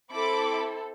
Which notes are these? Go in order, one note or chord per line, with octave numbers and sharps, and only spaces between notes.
C4 E4 A4 B5 D6